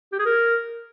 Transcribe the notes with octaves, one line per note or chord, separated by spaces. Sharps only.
G4
G#4
A#4